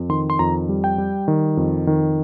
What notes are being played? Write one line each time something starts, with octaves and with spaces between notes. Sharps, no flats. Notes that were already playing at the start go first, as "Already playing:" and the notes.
Already playing: F2
D#3 C6
C6
F2 A#5
G3
G5
G3
D#3
F2
D#3